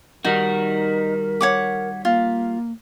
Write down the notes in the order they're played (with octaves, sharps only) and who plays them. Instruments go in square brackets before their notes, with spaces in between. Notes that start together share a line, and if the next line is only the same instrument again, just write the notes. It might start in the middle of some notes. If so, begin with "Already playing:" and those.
[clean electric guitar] D#3 G3 F#4 [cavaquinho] D#4 [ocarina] A#4
[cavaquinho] C#5 F#5 D6
[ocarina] A#3 [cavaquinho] F4